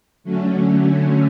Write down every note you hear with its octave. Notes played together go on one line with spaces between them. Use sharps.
D3 F#3 A3 C#4